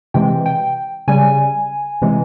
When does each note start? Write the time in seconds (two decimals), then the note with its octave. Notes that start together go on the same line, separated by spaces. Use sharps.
0.14 C3 E3 G#3 G5
0.46 G5
1.08 C#3 G3 G#5
2.02 C3 E3 G#3